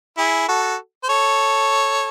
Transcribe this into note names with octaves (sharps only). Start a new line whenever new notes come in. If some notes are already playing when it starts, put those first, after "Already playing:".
E4 G#4
F#4 A4
C5
A4 C#5